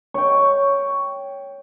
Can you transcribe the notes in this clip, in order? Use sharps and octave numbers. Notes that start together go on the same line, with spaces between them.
C#5 G5